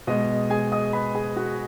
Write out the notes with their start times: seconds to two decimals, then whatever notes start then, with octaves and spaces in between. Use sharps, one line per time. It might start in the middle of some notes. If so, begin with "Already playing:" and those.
0.07 B2 G#3 D#5
0.50 G#4 G#5
0.72 D#5 D#6
0.93 B4 B5
1.15 G#4 G#5
1.36 F#4 F#5